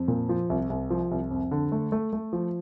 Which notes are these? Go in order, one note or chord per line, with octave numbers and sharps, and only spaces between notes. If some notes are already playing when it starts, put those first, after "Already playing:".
Already playing: F2
A#2
F3
C2
C2
F3
C2
F2
D3
A3
A3
A3
F3